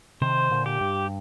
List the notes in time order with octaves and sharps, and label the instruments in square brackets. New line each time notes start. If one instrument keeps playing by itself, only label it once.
[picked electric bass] C3 D#3 [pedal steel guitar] C5
[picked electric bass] A#2 D3
[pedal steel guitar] G4
[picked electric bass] G2